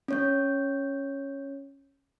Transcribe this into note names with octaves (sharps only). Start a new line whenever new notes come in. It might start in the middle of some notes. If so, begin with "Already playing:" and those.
C#4 C#5 G6